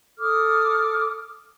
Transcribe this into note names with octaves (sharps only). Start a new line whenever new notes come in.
A4 D6 D#6 F6